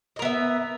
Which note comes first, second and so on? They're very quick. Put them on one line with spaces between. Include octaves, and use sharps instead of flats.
D#5 A#4 B3 E5